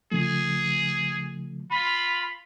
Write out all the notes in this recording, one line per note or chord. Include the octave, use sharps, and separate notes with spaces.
C#3 F3 A3 G#4
F4 B5